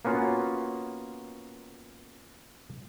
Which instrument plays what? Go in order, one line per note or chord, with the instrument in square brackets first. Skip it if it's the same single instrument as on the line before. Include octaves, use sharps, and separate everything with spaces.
[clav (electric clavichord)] A#3 B3 C#4 F4 F#4